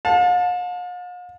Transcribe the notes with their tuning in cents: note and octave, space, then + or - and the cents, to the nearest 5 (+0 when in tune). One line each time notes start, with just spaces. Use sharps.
F5 +45 A5 +0